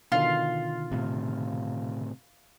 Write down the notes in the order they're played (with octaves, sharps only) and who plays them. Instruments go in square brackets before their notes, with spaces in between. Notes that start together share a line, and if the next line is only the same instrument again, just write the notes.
[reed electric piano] B2 D3 D#3 [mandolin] F4 [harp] F5
[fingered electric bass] A2 C3